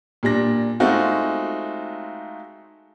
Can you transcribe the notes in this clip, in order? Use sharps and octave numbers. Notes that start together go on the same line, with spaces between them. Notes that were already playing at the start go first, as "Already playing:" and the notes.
A#2 G3 D4 A#6
G#3 A3 C4 D#4 F4 F#4